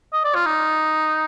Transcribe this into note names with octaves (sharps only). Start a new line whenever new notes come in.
D#5
D5
F4
D#4